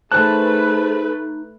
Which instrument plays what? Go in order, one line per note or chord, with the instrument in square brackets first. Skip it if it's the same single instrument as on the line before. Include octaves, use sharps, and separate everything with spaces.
[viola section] A3 B4 [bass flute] D#4 [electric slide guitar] G#4 C5 A5 [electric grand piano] F#6